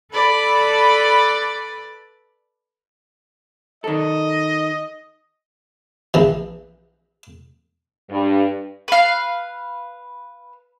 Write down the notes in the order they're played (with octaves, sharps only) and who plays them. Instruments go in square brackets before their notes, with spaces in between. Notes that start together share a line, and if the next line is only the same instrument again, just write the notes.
[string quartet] A4 B4 D5 B5
[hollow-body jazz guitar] D#3 A4 [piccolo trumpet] D#5
[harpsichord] A#1 E3
[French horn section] G2
[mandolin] B4 F5